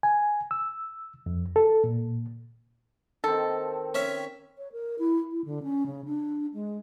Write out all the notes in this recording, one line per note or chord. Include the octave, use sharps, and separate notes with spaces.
G#5
E6
F2
A4
A#2
D#3 C4 A4
C#4 C#5 E5
C#5
A#4
E4
E4
D3
C#4
C#3
D4
G#3